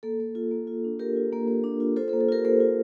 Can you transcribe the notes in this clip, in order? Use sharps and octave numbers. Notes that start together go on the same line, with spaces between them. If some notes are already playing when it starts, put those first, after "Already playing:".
A#3 A4
A#3
F4
A#3
F4
D4
A#3 G4 A#4
F4
A#3
A#3
D4
F4
F4 A4 C5
A4 C5
A#3
A4
F4 G4 A#4
A#3 A4 C5
F4